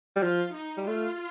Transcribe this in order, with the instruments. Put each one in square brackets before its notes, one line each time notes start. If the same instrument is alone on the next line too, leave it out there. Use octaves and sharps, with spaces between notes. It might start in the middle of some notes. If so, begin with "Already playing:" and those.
[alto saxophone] G3
[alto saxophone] F3 [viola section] F4
[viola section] D#4
[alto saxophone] G3
[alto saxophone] A3 [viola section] F4